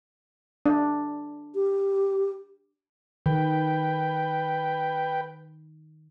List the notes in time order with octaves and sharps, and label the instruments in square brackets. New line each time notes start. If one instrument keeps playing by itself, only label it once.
[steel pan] D4
[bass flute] G4
[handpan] D#3 [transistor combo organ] B4 G5